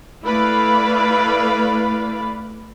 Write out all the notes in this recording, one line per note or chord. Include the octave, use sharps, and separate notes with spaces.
A3 E4 B4 D5 F5 B5